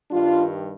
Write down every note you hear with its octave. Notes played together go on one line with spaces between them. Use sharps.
G2 D#3 G3 D4 F4